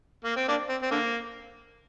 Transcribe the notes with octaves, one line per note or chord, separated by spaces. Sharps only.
A#3
C4
A#3 D4
C4
C4
D3 A#3